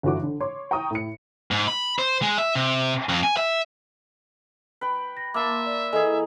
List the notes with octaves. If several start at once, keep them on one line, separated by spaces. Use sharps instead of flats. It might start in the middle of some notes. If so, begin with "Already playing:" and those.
G1 E3 F#4 D6
D3
C#5 C6 D6
G5 A#5 C#6 D#6
A2 C#7
G#2
B5
C5
G#3
E5
C3
F2
G#5
E5
B4 G5
A#6
A#3 E5 A5 C6 D6
D5
E3 G#4 A4 D#5 G#5